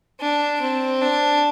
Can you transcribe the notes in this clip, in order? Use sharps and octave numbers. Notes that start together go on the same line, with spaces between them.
D4
C4
D4